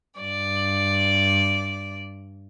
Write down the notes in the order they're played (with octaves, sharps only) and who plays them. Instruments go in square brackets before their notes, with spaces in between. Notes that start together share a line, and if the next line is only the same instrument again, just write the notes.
[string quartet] G2 D5